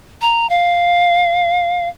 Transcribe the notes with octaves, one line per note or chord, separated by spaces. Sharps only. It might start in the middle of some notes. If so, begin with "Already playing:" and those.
A#5
F5